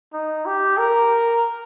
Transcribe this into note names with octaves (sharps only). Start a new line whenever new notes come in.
D#4
G4
A#4